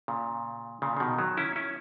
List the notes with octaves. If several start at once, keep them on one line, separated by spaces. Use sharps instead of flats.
A#2 C#3
A#2 C#3
C#3
B2 D#3
D#3 F#3
C#4 E4
C#4 E4